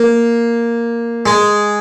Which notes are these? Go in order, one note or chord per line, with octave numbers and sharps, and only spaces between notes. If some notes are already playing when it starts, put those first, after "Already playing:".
Already playing: A#3
G#3